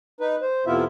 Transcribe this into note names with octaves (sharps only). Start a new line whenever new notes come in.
D#4 B4
C5
F2 C3 B3 E4 F4 E5